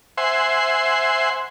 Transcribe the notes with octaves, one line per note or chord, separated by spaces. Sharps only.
C5 E5 F#5 G#5 C6